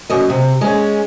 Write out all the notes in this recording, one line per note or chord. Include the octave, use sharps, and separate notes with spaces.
F#2 D#5
C3
G#3 C#4